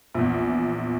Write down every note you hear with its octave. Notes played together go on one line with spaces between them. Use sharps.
A#1 E2